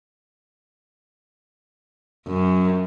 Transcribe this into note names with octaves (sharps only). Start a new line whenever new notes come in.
F#2